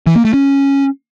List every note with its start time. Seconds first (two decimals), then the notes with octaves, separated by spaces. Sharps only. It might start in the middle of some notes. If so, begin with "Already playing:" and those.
0.07 E3
0.16 A#3
0.25 A3
0.34 C#4